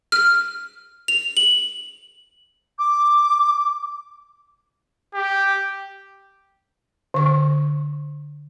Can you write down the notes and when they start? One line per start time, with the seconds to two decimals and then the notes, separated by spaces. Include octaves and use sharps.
0.12 F6
1.08 F7
1.37 F#7
2.79 D6
5.15 G4
7.14 D3 C#6